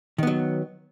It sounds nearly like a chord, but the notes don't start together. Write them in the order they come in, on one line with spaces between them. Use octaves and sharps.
D#3 B3 F#3